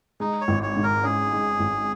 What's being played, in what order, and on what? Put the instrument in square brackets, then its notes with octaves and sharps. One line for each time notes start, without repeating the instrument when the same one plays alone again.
[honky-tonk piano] G#3 [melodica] D#4
[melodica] C#5
[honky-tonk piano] G#1
[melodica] C#5
[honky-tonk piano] G#2
[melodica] A#4
[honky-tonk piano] C#4 [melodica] G#4
[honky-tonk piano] G#3
G#1